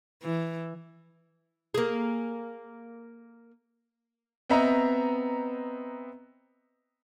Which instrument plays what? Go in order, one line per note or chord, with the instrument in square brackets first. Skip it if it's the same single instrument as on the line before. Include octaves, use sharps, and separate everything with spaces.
[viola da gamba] E3
[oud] A#3 G#4
[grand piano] B3 C4 D#5 E5 A#5